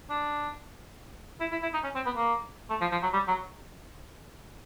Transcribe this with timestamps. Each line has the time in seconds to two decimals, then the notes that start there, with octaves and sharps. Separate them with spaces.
0.10 D4
1.40 E4
1.52 E4
1.62 E4
1.73 D#4
1.83 C#4
1.95 C4
2.05 B3
2.17 A#3
2.70 A3
2.81 F3
2.92 F3
3.03 F#3
3.13 G3
3.28 F#3